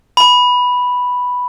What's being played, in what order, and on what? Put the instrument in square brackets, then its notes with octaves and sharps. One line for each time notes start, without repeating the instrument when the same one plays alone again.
[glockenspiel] B5